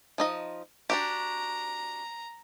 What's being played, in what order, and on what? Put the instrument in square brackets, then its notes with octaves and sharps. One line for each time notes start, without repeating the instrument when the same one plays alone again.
[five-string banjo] F3 D#4 D#5
[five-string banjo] D4 F#4 G4 [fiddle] A#5